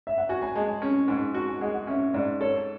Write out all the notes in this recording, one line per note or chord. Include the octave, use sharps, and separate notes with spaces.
E5
F#5
F#4 G#5
G#5
G#3 A5
G#5
C#4
G#2 G#5
F#4 A5
G#5
G#3 F#5
F#5
C#4 E5
G#2 D5
A4 C#5